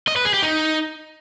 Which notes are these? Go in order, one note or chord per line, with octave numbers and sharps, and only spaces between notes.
D#5
B4
G#4
G4
D#4